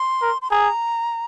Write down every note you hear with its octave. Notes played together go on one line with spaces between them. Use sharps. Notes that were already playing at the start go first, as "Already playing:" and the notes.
Already playing: C6
A#4
C6
G#4 A#5